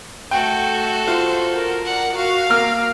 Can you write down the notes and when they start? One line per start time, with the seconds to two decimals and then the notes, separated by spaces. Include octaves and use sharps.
0.31 A3 F#4 A4 G5
1.08 F4 C5
1.53 A#4
1.85 D5 F#5
2.16 F#4 F5
2.50 A#3 A#5 F6